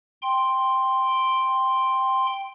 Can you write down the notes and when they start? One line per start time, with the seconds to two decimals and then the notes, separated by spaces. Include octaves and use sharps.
0.22 G5 C6